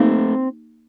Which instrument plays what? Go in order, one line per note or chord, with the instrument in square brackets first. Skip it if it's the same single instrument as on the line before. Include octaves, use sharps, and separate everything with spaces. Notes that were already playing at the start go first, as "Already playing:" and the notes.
Already playing: [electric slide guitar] A3 C4 [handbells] A#3 D#4 G4